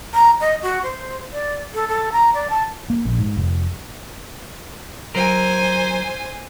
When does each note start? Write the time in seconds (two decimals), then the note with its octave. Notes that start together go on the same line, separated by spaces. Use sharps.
0.14 A#5
0.41 D#5
0.62 F#4
0.83 C5
1.33 D5
1.74 A4
1.88 A4
2.12 A#5
2.34 D5
2.50 A5
2.90 A#3
3.05 A#1
3.19 G#2
3.37 F1
5.15 F#3 A#4 C5 G#5